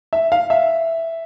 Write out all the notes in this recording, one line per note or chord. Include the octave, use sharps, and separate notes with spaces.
E5
F5
E5